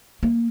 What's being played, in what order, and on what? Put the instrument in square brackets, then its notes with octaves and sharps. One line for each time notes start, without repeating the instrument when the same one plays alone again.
[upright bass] A#3